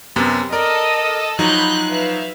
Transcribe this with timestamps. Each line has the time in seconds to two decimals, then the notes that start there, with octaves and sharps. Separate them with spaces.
0.16 F#2 C3 B3
0.52 A4 A#4 D5 D#5
1.39 F3 F#3 D#4 A#5 B5 F#6 G6
1.88 B4 E5 F5